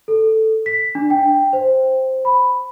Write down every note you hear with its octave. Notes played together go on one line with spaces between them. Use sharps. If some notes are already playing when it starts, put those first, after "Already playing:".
A4
B6
D4
G5
C5
B5